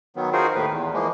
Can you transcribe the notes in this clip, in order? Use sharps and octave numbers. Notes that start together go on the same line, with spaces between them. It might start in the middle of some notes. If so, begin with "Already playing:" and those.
D#3 F#3 B3
D#4 F4 F#4 G#4 A#4 C5
D#2 A2 D#3 B4
E2
E3 F3 G#3 A#3